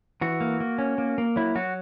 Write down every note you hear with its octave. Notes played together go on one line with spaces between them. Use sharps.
E3 F#4
A#3
A#3
C#4
A#3
A#3
F#3 E4
F#3 F#4